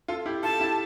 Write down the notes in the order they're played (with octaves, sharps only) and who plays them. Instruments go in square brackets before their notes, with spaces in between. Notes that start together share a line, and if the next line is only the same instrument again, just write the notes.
[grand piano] F4 A4
E4 G4
[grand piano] F4 A4 [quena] A5
[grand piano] E4 G4